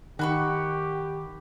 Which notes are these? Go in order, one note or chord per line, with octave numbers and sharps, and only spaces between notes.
D#3 F#4 G4 B5 C#6